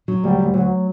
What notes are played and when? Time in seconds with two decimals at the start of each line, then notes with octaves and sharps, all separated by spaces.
0.08 F#3
0.23 D2 G3
0.39 D2
0.54 D2 F#3